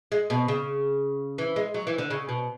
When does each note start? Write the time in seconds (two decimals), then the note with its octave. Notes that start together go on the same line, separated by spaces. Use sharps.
0.12 G#3
0.30 B2
0.48 C#3
1.38 E3
1.56 G#3
1.74 F#3
1.87 E3
1.98 D3
2.10 C#3
2.29 B2